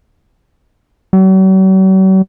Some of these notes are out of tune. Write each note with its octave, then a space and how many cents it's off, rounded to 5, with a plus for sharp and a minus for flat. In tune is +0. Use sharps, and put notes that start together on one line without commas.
F#3 +45